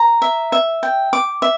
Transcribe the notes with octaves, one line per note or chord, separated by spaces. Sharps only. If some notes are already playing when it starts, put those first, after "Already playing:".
Already playing: A#5
E5
E5
G5
D6
E5